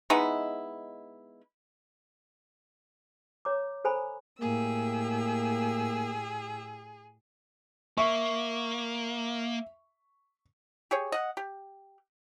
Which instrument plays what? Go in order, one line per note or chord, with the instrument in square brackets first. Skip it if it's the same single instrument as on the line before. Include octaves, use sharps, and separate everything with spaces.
[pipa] G#3 B3 D#4 E4
[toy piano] C#5 A#5 D6
A4 C5 G#5 A#5 B5
[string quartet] A2 G4 E6 [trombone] A#3 [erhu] G#4
[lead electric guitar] A#3 [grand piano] E5 [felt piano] C#6
[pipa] G4 G#4 C#5
D#5 F#5
G4